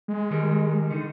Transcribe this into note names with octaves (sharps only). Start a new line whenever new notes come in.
G#3
D#3 G3 A#4
D3 D#3 D#4